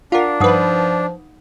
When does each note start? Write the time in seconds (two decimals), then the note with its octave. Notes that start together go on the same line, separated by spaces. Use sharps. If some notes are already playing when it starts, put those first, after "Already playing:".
0.12 D4 F4 A#4 F5 F#5
0.40 G2 F3 D#4 B4 F#5 D#6